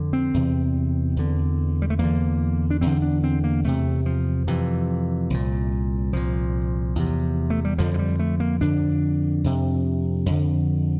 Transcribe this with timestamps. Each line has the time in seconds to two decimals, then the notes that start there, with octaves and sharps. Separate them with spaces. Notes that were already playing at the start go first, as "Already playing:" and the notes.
Already playing: F2 D3
0.13 C4
0.34 E2 C3
1.17 E2 D3
1.82 G3
1.90 A3
1.99 E2 D3 A#3
2.70 D4
2.81 E2 D3 C4
3.02 D4
3.24 C4
3.44 A#3
3.64 E2 C3 A3
4.06 F3
4.47 F2 C3 E3
5.30 C2 A#2
6.13 C2 A#2 F3
6.96 E2 C3
7.50 A3
7.65 G3
7.78 F2 D3 F3
7.94 F3
7.99 G3
8.19 A3
8.40 A#3
8.61 F2 D3 D4
9.44 F2 C3
10.26 F2 D3